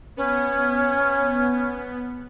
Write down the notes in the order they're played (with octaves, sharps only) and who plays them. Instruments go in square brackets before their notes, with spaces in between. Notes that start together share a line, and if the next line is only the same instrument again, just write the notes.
[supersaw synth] B3 [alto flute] C#4